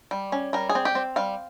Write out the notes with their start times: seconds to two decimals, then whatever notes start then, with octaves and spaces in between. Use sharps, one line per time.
0.11 G3
0.32 C#4
0.53 G3 A#4
0.69 G#4
0.75 C4
0.85 G4
0.95 C4
1.16 G3 F5